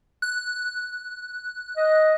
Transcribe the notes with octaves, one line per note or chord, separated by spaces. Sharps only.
F#6
D#5